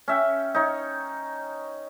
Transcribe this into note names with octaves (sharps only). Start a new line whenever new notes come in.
C#4 E5 G5
D#4 C#5